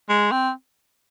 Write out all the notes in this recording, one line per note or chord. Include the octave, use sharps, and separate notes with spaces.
G#3
C4